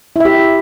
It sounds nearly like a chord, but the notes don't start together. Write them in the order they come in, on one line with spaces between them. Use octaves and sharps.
E4 E5 G4